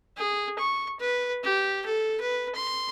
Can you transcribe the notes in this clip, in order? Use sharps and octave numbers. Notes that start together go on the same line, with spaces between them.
G#4
C#6
B4
G4
A4
B4
C6